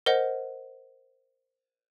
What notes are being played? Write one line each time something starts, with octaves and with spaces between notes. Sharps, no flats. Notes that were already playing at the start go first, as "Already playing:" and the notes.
A#4 C5 D#5 F#5